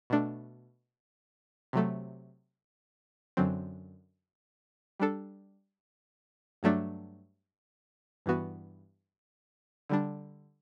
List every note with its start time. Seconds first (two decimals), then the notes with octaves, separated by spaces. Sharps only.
0.10 B2 A3 D4
1.73 C3 F#3 A3
3.37 F#2 D3 F#3 C4
5.00 G3 D4 A4
6.63 G2 F#3 A3 D4
8.26 G2 E3 B3 F#4
9.89 D3 G3 D4